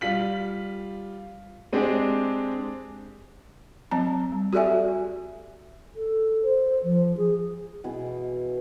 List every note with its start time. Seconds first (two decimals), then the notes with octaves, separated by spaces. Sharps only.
0.01 G3 F4 B6 F#7
1.73 G#3 C4 D4 G4 G#4
3.91 F#3 C4 A5 A#5
4.32 G3
4.53 F#4 G4 A4 D5 E5 G#5
5.96 A4
6.43 C5
6.83 F3
7.17 G#4
7.84 B2 E3 G#4